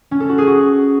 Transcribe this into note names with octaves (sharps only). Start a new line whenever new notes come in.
C#4
A4
F#4
G#4
F#4